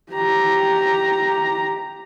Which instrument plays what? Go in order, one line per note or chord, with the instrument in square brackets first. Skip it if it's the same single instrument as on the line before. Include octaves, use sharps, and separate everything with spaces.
[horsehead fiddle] G4 A#5